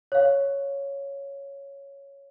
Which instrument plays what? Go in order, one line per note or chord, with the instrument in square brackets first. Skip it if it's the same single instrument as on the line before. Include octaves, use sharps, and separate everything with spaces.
[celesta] C#5 F5